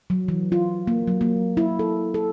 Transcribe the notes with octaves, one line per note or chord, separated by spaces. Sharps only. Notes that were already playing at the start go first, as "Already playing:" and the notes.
F#3
E3
F4
A#3
F#3
A#3
E4
A4
A4